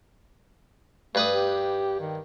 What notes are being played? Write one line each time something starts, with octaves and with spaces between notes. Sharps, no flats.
G2 A3 B4 D#6
G4
D#3